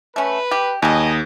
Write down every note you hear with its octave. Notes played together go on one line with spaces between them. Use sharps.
A3 C#4 B4
G4
D#2 G3 G#4 D#5